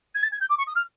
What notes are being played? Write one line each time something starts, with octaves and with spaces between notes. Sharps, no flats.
G#6
A6
G#6
G6
D6
C#6
D#6
F6